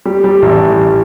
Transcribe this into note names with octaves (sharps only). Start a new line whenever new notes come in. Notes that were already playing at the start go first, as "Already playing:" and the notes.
G3
G3
A1